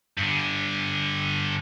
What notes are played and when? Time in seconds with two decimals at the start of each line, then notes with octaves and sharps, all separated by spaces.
0.18 G2 D3